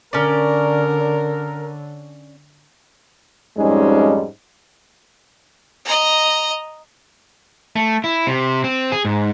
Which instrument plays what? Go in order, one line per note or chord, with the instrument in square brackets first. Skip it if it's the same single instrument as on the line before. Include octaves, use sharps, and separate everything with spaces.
[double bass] D3 [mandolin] C#4 D5 [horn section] A#4
[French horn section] F2 G#2 G3 G#3 C#4 D#4
[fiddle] D#5 A#5
[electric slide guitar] A3
E4
C3
C4
G#4
G#2